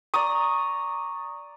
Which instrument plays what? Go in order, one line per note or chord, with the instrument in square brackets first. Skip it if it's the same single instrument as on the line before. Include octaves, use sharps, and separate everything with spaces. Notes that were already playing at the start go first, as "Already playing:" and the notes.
[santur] D5 A#5 D#6 [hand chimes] C#6